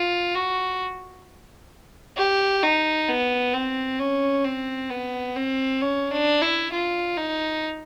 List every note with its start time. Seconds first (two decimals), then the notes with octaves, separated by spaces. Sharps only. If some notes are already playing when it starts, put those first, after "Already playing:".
Already playing: F4
0.35 F#4
2.17 G4
2.63 D#4
3.09 B3
3.54 C4
4.00 C#4
4.45 C4
4.90 B3
5.36 C4
5.81 C#4
6.11 D4
6.42 E4
6.72 F4
7.17 D#4